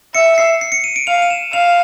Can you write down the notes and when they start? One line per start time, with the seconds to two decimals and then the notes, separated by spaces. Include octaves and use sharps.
0.15 E5 C#7
0.38 C7
0.61 C7
0.72 C#7
0.84 D#7
0.96 D7
1.07 F5 F7
1.22 D#7
1.31 E7
1.53 F5 F7